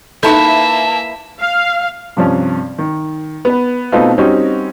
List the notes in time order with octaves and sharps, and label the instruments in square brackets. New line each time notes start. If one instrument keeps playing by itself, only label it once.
[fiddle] A#3 E5 [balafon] D#4 A4 [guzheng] E4 B4 [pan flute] A5
[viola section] F5
[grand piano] G2 C3 F3 C#4
D#3
B3 B4
B2 A3 B3 C4 D#4 F4
G3 C4 C#4 D#4 F#4